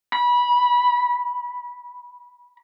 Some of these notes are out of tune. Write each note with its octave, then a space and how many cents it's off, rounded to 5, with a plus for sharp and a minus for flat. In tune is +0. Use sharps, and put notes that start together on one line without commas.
B5 -25